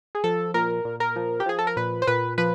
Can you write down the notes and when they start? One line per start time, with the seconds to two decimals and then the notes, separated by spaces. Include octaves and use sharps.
0.15 G#4
0.24 F3 A4
0.54 A#2 A#4
0.85 A#2
1.00 A#4
1.16 F3
1.40 G4
1.46 F3 G#4
1.59 A4
1.67 A#4
1.76 A#2 B4
2.02 C5
2.07 A#2 B4
2.38 F3 B4